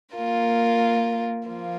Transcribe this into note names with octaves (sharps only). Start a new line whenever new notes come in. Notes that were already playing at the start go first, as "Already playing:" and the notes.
A#3 F4 A#4
F3 A#3 F4